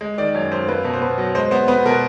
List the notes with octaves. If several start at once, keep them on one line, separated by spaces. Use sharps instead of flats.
G#3
D#3 D5
F#2 C#5
F#2 C5
A#3 B4
B2
C5
B2 B4
F#3
G#3 C5
B3 C5
B3 B4
B2 A#4